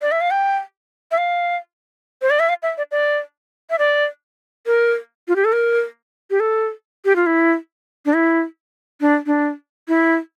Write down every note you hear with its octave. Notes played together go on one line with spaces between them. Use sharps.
D5
E5
F5
G5
E5
F5
C5
D5
E5
F5
E5
D5
D5
E5
D5
A#4
F4
G4
A4
A#4
G4
A4
G4
F4
E4
D4
E4
D4
D4
E4